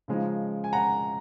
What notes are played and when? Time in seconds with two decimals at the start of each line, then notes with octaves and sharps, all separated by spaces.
0.08 C#3 F3 G#3 D#4
0.64 G#5
0.73 F#5 A#5